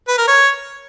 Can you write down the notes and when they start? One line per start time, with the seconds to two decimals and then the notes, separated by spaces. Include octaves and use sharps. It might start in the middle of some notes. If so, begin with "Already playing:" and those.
0.08 B4
0.18 A#4
0.27 C#5